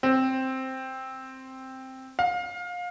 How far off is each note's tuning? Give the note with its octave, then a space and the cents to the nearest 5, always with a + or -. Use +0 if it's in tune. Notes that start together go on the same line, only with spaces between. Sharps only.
C4 +5
F5 +25